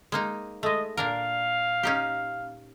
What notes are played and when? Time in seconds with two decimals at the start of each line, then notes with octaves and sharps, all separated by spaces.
0.12 G#3 A#3 D#4
0.63 G#3 A3 D#5
0.97 A#2 D4 A#4 F5
1.83 C#4 D#4 G4